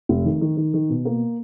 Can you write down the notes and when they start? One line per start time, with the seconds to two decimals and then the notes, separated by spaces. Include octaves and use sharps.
0.09 F1
0.25 D#3
0.41 D#3
0.57 D#3
0.74 D#3
0.89 B2
1.05 A#3